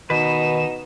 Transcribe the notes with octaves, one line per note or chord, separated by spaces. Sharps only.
B2 D#3 D#4 B4 E7